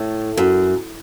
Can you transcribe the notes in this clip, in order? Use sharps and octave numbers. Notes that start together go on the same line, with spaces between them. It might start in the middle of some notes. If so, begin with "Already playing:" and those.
Already playing: A2
F#2